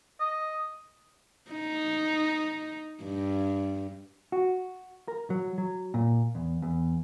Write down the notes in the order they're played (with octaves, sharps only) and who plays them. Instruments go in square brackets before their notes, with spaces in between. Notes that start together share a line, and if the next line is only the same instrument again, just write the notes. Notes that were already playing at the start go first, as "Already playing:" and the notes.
[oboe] D#5
[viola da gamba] D#4
G2
[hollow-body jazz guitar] F#4
A#4
F#3
F#3
A#2
E2
E2